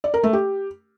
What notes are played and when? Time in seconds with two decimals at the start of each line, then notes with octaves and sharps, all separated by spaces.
0.04 D5
0.14 A#4
0.23 A3
0.33 G4